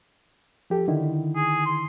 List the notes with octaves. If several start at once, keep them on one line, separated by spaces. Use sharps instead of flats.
F3 G4 A4
D3 D#3 E4
G#4
C6